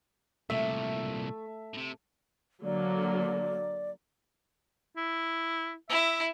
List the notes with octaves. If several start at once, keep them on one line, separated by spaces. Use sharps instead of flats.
C2 A#2 A3 E5
A2 C3
D3 F#3 A#3 D5
E4
E4 E5